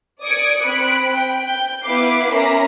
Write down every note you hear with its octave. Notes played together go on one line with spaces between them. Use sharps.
D5 D#6 G#6 C#7 D7
C4 B5 F#6 D7
G5
G6
B3 E4 B4 F5 D6 C7
C#4 A#4 E5 A#5 B5